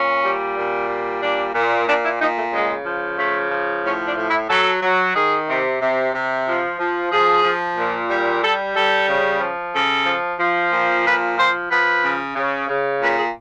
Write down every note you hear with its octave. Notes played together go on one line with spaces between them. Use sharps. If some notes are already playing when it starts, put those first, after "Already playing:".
Already playing: A#2 C#4
G3
A#2
G3
A#2 D4
A#2
A#2 D4
E4
A#2 D#4
A3
C#3 G#3
F3
C#3 A3
F3
A2 C#4
D4
A2
E4
F#3 A4
F#3
D#3 G#4
C3
C3
C3
F3
F3
F3 G#4
F3
A#2
G3
G3 A4
G3 A4
C#3
F3
C#3 A4
F3
F3
A#2
F3 B4
F3 C5
F3 B4
C#3
C#3
C#3
A#2 B4
G#4